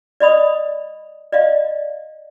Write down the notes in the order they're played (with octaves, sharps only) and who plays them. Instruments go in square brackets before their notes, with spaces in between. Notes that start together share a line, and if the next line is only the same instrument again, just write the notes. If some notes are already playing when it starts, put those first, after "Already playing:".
[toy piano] D5 D#5 B5 D#6
D5 D#5 F5